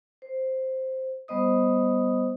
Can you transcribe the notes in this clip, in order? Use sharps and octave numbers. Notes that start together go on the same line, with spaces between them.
C5
G3 B3 C5 D#5 D#6